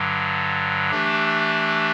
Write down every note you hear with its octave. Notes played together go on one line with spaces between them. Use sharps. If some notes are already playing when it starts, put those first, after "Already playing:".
Already playing: G2 D3 F#3
E3 A3 D4 G4